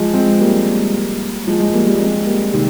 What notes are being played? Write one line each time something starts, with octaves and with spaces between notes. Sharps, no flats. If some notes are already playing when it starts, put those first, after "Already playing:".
Already playing: F3 G#3
G#3 C4
G3 A#3
F3 G#3
F3 G#3
G3 A#3
G3 A#3
G#3 C4
G3 A#3
C3 D#3